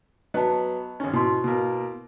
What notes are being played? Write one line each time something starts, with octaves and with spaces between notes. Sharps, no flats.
F#3 B3 D#5 A5
G#1 C#4
B2 E4 C6
B2 A#3